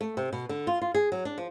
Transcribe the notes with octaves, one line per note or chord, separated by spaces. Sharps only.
A3
C3
B2
D3
F4
F4
G#4
F#3
D4
F3